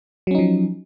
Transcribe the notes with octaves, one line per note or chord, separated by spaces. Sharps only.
F3 F#3 C#4 D#4